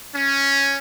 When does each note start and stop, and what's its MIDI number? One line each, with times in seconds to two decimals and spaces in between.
0.14 0.76 61